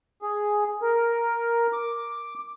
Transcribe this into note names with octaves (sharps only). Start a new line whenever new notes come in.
G#4
A#4
D6